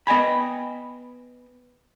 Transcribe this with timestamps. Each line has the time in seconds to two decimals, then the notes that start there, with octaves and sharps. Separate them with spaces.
0.07 B3 D#5 G5 G#5 B5